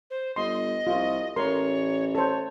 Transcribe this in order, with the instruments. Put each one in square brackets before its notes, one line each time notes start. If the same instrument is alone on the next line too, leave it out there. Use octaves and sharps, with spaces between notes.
[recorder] C5
[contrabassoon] G1 [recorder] D#5 [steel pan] C6
[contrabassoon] C2 [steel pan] F4
[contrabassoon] A1 [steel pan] A#4 C6 [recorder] C#5
[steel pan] A4 C5 [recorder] C#5